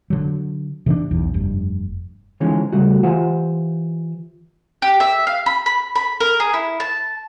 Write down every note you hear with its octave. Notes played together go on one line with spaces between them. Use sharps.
D3 F#3
C3 E3 C4 D4
B1 E2
F1 G2
D3 E3 F3 G#3 C#4 D#4
C#3 G3 A3 F#4
E3 F4 G4 C5 F#5
G4
E5
F5
B5
B5
B5
A#4
G#4
E4
A5